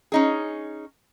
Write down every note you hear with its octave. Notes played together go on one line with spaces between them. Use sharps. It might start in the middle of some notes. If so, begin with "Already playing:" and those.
C#4 D#4 G#4